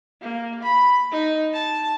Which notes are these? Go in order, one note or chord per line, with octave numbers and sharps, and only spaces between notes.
A#3
B5
D#4
A5